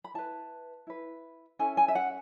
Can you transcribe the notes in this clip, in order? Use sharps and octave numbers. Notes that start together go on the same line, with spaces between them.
B5
E4 B4 A5
E4 B4
C#4 E4 A4 G#5
G#5
E5
F#5